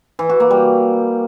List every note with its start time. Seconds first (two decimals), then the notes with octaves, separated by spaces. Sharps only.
0.19 E3
0.29 F#4
0.40 A#3
0.51 G3